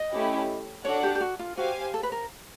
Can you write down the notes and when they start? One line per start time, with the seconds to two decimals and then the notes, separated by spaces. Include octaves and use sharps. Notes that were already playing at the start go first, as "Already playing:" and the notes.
Already playing: D#5
0.11 A3 C#4 E4 G4
0.84 D4 F#4 A4 C#5 D5 F#5
1.03 G4
1.15 G4
1.21 F#4
1.39 F4
1.57 F#4 G4 C5 F5 G#5
1.94 A4
2.03 B4
2.12 A#4